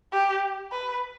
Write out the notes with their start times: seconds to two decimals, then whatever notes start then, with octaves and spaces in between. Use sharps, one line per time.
0.12 G4
0.72 B4